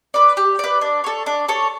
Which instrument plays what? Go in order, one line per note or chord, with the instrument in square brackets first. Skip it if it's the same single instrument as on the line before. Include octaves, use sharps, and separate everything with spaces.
[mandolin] B4 D5
G4
B4 D5
D4
A4 C#5
D4
A4 C#5